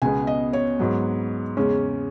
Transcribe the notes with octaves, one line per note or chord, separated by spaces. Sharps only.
C#2 B2 G#3 B3 G#5
D#5
C#5
G#2 F#3 B3
E2 C#3 G#3 C#4